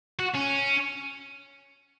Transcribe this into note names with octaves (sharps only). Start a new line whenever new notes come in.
F#4
C#4